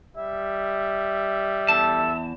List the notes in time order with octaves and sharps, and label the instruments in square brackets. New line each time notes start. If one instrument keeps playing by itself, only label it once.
[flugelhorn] G3 [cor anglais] E5
[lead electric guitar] E2 A5 [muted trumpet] A4